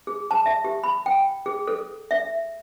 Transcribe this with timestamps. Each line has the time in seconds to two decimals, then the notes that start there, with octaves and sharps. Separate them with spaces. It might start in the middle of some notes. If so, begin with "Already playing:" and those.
0.07 G#4
0.31 A5
0.46 E5
0.65 G4
0.84 B5
1.06 G5
1.46 G#4
1.67 A4
2.11 E5